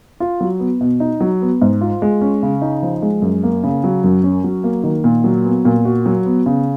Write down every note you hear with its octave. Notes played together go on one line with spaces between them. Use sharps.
F4
F#3
B3
B2
D#4
F#3
B3
G#2
F4
G#3
C#4
C#3
D#4
F3
G#3
F#2
A#3
C#3
F#3
F#2
C#4
F#3
A#3
D#3
A#2
F#3
B3
A#2
F#4
F#3
B3
C#3